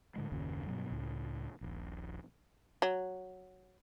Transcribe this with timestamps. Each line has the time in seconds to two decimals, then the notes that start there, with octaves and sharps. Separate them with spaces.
0.16 A2 D3 G#3
0.32 F#1 D#2 A#2 C#3
0.67 G2 B2 F#3
0.90 C#2 A2
1.61 D#1 A#1
2.82 F#3